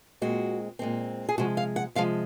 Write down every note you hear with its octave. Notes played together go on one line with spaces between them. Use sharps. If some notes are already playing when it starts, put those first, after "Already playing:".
A#2 G#3 C4 F#4
A#2 G#3 C4
G#4
C3 F3 G#3 F#4
F5
F#5
C3 F3 G#3 F5